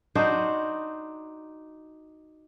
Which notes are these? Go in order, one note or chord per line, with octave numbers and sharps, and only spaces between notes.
D4 D#4 F#4 C5